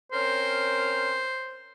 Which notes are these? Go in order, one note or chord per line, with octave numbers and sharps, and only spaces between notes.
C4 C#4 A#4 C5